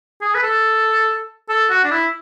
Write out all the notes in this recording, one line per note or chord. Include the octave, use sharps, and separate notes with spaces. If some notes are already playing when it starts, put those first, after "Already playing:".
G#4
B4
A4
A4
F#4
D4
E4